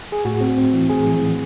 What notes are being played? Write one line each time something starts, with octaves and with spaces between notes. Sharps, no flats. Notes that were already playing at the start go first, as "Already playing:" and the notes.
G#4
A2 F#4
C4
C4
E3
A2 G#4
E3
E3